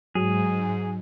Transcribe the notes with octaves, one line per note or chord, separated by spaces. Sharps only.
G#2 F#3 G#4